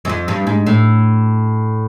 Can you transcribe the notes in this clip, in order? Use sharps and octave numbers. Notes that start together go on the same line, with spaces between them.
F#2
F2
G2
G#2
A2